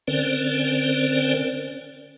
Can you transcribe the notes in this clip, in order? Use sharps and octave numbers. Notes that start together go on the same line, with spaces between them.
D3 C4 C#4 A#4 C5 D5